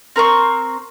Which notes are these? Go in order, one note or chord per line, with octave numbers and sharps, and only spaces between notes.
C4 A#4 C5 C#6